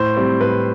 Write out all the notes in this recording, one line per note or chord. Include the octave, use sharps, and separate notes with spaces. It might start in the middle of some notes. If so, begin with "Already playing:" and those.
Already playing: A2 C5
G3 C4
A2 B4